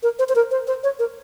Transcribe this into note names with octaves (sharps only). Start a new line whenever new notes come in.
A#4
C5
C5
A#4
C5
C5
C#5
A#4